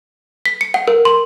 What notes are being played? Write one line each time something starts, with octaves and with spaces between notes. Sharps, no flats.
B6
C#7
F#5
A#4
C6